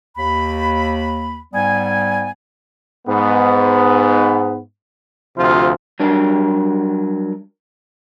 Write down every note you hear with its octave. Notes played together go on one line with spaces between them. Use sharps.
D#2 B5
G#2 G3 B3 G#5
G#2 B3
D2 C3 F3 F4
F#3 G3 D4 A#4